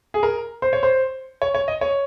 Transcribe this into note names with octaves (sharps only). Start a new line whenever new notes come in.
G#4
A#4
C5
C#5
C5
C#5
C#5
D#5
C#5